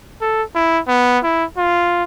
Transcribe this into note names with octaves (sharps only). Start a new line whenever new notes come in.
A4
E4
B3
E4
F4